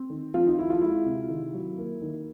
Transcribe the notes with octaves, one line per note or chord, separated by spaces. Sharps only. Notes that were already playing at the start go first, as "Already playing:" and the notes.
Already playing: C4
D#3
F3 C4 F4
D#4
F3 E4
F3 F4
G#3 E4
C3
D#3
F#3
A#3
D#3